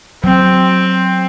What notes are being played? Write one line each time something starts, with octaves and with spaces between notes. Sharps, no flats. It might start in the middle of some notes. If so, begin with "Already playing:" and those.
F#3 C4